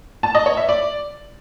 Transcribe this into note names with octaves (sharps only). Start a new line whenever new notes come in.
A5
D#5
C#5
E5
D5